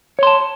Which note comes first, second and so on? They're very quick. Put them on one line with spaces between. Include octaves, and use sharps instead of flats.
C#5 C6 A5